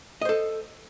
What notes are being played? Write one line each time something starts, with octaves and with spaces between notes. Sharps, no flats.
A4 C5 D#5